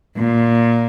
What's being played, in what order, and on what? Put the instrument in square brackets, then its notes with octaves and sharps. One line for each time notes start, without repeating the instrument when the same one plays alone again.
[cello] A#2